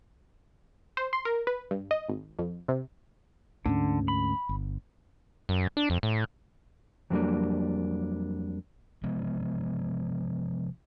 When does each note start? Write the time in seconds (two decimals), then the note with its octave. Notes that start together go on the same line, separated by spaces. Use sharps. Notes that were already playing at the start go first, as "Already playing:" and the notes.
0.97 C5
1.13 C6
1.25 A#4
1.47 B4
1.71 G2
1.91 D#5
2.09 G#1
2.39 F2
2.68 C3
3.66 D2 G#2 D3 C#4
4.08 B5
4.49 G1
5.49 F#2
5.77 D4
5.90 F2
6.03 A2
7.10 F2 F#3 G3 A#3 D4
9.03 C3 F3 G#3 B3